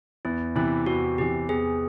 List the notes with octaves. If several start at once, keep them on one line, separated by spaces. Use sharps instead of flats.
E2 E4
C3 E3 E4
E2 F#4
C3 E3 G4
E2 G#4